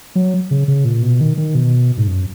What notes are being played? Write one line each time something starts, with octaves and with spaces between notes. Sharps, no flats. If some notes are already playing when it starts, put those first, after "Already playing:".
F#3
C#3
C#3
A#2
B2
D#3
D#3
B2
G#2
F#2